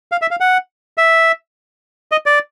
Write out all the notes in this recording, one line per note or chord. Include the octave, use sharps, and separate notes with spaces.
F5
E5
F5
F#5
E5
D#5
D5